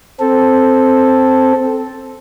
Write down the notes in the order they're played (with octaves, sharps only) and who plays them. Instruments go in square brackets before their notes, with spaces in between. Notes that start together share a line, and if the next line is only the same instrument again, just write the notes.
[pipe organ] C4 A4